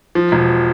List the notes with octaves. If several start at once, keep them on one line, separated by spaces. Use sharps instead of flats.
F3
E1